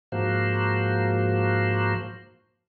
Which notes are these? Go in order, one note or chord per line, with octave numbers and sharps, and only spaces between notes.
G#2 F3 A#3 F#4 C5